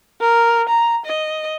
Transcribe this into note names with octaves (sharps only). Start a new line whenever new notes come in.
A#4
A#5
D#5